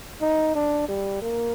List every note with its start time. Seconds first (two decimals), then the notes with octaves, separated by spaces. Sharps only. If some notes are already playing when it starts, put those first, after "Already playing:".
0.22 D#4
0.55 D4
0.89 G3
1.22 A#3